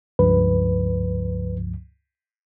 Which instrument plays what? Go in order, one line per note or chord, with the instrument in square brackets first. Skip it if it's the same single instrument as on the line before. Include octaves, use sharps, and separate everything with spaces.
[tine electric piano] C#2 G2 F3 [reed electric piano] B4